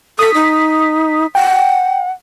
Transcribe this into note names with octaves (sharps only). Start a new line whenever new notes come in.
A4 D#6 B6
D#4
F#5 G5